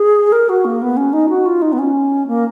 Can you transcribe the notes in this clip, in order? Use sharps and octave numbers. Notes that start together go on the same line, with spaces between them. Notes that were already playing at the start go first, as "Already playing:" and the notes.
Already playing: G#4
A#4
F#4
A#3
B3
C#4
D#4
F#4
F4
D#4
B3
C#4
A#3